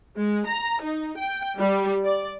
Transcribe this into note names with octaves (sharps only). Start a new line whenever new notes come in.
G#3
A#5
D#4
G5
G3
D5